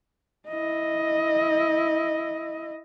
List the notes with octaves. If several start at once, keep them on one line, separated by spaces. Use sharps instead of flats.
E4 D#5